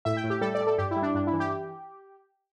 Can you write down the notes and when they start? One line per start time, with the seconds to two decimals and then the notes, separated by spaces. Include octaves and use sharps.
0.05 A2 E5
0.17 G5
0.24 A2
0.30 G4
0.41 G3 A4
0.55 D5
0.60 G3
0.67 A4
0.78 G2 G4
0.91 E4
0.96 G3
1.03 D4
1.14 G2 D4
1.27 E4
1.33 E3
1.40 G4